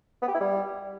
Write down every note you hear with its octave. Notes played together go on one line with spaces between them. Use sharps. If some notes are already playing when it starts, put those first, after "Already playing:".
B3
G4
E4
G3